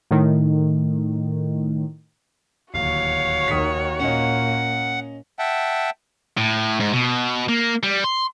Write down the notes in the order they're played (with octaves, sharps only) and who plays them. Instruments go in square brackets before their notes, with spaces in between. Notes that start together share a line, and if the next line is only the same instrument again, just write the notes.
[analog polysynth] A2 D#3
[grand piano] D1 D#2 [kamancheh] F#4 C#5 [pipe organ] F5
[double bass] D#2 D#3 [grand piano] D#6 B6
[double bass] A#2 A#3 [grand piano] C#4 D#5 [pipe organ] F#5
[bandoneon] E5 F#5 G5 A5
[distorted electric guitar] A2
G#2
B2
A#3
G3
C6